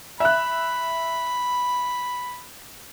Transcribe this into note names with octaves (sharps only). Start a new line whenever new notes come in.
E5 B5 F#6